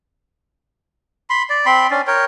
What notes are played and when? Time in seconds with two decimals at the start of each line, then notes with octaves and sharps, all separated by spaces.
1.30 B5 C6
1.50 D5
1.66 C4 B5 C6
1.90 C#4 D4
2.07 A#4 C#5 G5